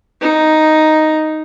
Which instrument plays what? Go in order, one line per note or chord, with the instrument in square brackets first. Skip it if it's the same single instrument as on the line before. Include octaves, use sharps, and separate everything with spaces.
[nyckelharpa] D#4